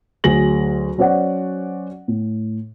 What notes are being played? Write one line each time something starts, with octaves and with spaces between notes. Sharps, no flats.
D2 F#3 G#4 A#6 F#7
F#3 C#4 F#4 C5 D5 F#5
A2